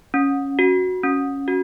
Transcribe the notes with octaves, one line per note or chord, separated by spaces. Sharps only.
C#4
F#4
C#4
F#4